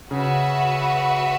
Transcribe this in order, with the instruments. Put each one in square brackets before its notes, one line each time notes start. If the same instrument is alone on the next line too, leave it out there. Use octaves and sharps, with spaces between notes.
[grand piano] C#3 [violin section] F#4 B4 E5